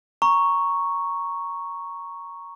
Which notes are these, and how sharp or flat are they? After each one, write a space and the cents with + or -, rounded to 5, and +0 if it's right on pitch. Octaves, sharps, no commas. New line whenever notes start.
A#5 +0 C#6 +0